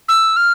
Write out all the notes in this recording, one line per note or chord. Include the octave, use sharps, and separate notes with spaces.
E6
F6